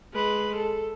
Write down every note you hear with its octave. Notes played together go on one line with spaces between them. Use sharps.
G#3 B4
A4